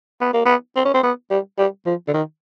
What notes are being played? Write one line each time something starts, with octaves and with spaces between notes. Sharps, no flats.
B3
A#3
B3
C4
C#4
C4
B3
G3
G3
F3
D3
D#3